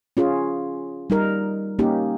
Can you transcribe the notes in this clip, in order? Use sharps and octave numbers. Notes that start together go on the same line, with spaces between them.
C#4 F4 G#4
G3 D#4 A#4
A#3 C#4 D#4 G4